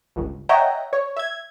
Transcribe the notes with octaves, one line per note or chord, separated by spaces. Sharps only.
G1 C#2
C#5 D#5 E5 F#5 G5 A#5
C#5
E5 G#6